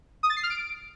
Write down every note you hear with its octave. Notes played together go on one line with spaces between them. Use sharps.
D#6
A6
C7
F6
D7